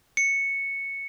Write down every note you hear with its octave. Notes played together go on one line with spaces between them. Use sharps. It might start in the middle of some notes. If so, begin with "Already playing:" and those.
C#7